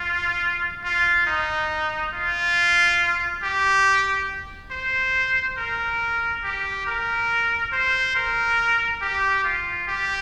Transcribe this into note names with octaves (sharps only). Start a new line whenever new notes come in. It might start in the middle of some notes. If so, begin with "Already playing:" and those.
Already playing: F4
F4
D#4
F4
G4
C5
A#4
G4
A#4
C5
A#4
G4
F4
G4